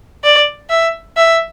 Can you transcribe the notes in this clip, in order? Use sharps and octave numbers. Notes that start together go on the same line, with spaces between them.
D5
E5
E5